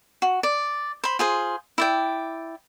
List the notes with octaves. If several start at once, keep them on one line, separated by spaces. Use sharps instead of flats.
F#4
D5
C5 B5
F4 G#4 C5
E4 D5 G5